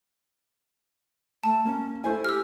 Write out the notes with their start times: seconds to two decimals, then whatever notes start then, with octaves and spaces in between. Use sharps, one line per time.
1.44 A3 A5
1.65 A#3 C#4
2.04 A3 E4 C5 G#5
2.24 G4 E6 F6